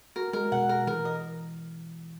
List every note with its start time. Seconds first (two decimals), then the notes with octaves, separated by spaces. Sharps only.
0.16 F#4 A#4
0.33 G#3 A#4
0.52 B2 F#5
0.69 A#4
0.87 E3 A#4
1.05 D#5